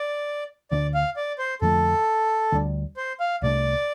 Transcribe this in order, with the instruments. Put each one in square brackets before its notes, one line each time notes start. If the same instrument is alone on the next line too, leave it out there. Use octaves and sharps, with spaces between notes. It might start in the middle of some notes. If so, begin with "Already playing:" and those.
Already playing: [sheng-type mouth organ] D5
[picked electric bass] D2 D3 G3 D4 [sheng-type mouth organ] D5
[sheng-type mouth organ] F5
D5
C5
[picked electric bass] F2 D3 F3 A3 [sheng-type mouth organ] A4
[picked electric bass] D2 D3 G3 D4
[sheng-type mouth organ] C5
F5
[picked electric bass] C2 C3 A3 D4 [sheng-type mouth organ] D5